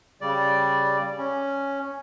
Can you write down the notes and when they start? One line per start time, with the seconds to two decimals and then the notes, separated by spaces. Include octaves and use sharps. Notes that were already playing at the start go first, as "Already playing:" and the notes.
0.21 C#3 G3 D5
1.18 C#4